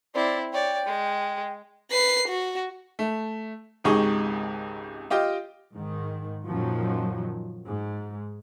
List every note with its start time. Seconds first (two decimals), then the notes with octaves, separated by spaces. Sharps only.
0.14 C4 E4 D5
0.52 C#5 D5 G5
0.85 G#3
1.91 B4 C7
2.28 F#4
2.99 A3
3.84 G#1 C#2 D#4 G4 G#4 C#6
5.10 F4 G4 D#5 G5
5.72 G#2 D#3
6.44 F#2 A#2 D#3 F3 F#3
7.65 G#2